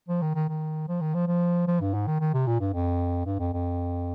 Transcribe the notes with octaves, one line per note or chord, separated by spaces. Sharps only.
F3
D#3
D#3
D#3
F3
D#3
F3
F3
F3
G2
G#2
D#3
D#3
C3
A#2
G2
F2
G2
F2
F2